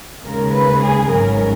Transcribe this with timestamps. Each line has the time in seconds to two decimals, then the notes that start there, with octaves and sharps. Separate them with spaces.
0.24 D#2 C#3 G#3 A#4
0.53 B4
0.81 G#4
1.08 G#1 G#2 F#3 C#4 A#4